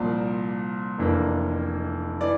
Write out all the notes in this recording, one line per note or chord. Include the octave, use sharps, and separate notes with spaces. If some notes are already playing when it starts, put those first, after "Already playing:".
Already playing: C2 A#2 F3 D5
F1 F2 E3 A#3 D4
E3 D5